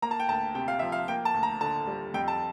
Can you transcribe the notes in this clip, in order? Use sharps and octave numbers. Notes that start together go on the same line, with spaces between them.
A#3 A#5
A5
G5
D2 A5
C3 G5
F5
F3 E5
F5
A#3 G5
A5
D2
A#5
D3 A5
G3
F2 G5
A5